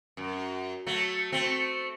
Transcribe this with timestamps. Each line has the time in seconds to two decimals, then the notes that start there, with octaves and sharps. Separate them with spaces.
0.17 F#2
0.86 F#3 A3
1.32 A3 C4